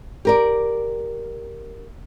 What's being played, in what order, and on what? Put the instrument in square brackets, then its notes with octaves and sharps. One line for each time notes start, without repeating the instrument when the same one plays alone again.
[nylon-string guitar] G4 A#4 D5